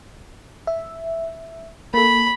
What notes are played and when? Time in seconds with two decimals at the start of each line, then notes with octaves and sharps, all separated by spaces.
0.67 E5
1.94 A#3 A4 B5